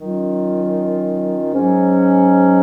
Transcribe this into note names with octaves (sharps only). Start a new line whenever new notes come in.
D#3 F#3 C#4 F4
G#2 F#3 C#4